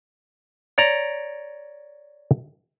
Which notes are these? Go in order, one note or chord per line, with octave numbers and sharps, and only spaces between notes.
C#5 D5 A#5